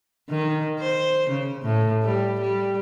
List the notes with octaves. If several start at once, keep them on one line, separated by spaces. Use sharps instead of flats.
D#3
C5
C#3
A2
G3
G3